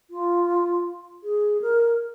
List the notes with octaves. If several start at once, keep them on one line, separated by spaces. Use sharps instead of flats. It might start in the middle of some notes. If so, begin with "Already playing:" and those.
F4
G#4
A#4